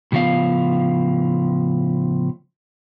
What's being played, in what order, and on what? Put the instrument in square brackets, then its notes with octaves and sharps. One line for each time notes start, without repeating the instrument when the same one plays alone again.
[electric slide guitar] A2 C#3 F3 B3 F5